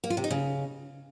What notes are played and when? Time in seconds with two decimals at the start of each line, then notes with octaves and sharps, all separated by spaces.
0.04 A#3
0.10 F4
0.17 C3
0.24 D#4
0.31 C#3